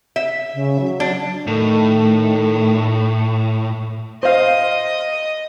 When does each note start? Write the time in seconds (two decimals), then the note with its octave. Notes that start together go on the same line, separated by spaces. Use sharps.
0.16 E5
0.54 C#3
0.80 F#3
1.00 D4
1.47 A2 D#3 A3
4.23 C5 D#5 F5